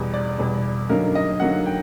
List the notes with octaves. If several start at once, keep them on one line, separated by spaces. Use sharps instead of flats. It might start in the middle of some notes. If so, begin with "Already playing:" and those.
Already playing: E2 B2 G3
D5
E2 B2 G3
F#2 D3 F#3 A#3 D#4 A#4
D#5
F#2 D3 F#3 A#3 D#4 F#5
G5